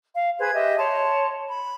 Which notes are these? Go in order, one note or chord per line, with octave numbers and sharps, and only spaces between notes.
F5
G#4 B4 C5 G#6
G4 D#5 E5
C#5 A5 C6
B5